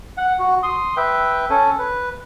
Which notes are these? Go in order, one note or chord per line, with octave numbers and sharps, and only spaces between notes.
F#5
F#4
C6 D#6
B4 E5 G5
C#4 A4
B4